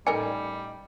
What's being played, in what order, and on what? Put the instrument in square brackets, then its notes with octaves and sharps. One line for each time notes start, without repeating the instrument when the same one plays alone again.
[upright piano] A1 D#4 C#7 [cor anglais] G3 [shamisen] A4 A#4 D5 [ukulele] G#5